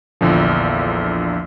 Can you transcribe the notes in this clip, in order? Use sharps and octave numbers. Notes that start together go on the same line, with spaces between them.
A#1 E2 D3 F3